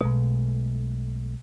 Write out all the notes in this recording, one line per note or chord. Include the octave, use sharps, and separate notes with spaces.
B1 B2 G#3 A3